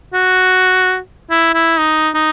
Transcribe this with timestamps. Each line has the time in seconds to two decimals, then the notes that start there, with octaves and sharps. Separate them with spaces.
0.14 F#4
1.31 E4
1.54 E4
1.78 D#4
2.15 D#4